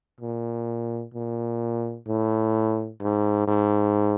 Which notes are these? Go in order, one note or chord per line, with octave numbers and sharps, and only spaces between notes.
A#2
A#2
A2
G#2
G#2